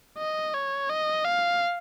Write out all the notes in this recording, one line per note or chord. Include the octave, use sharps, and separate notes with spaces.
D#5
C#5
D#5
F5